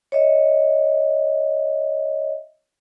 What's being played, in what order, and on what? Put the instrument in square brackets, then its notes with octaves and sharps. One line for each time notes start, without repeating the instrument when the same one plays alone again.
[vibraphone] C#5 D#5 E5